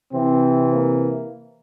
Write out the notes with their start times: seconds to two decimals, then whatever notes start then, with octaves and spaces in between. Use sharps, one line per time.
0.12 C3 E3 C4
0.74 A#3